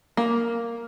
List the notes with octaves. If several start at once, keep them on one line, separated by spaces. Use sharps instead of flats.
A#3